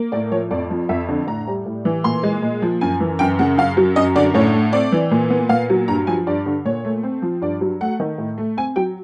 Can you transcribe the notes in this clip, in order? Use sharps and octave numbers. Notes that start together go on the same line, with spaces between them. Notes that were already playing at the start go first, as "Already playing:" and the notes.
Already playing: A#3
A2 D5
F3 C#5
F2 D5
F3
F2 E5
D3
A2 A#5
G3
A2
E3
A#2 C6
G#3
A#2
F3
F#2 G#5
E3
F#2 G5
C#3 F#5
F#2 F5
F#3
F#2 D#5
D3 D5
A2 C#5
A3
C4 D5
E3
A#2
B3
A#2 F5
F#3
G2 A#5
F3 G#5
G2 D5
D3
A#2 C#5
A3
C4
F3
G2 D5
F#3
A3 F#5
D#3
A2
A3
C4 G#5
F#3 G5